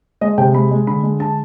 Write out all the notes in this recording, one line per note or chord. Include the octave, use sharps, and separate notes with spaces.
G#3 D#5
C3 G5
G#3 B5
G#3
D3 B5
G#3
D3 A5